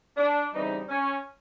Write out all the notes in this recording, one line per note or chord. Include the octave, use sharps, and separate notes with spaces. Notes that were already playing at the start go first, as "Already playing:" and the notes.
D4
C#3 E3 G3 C4 D#4
C#4